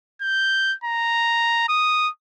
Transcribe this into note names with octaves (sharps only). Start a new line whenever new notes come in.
G6
A#5
D#6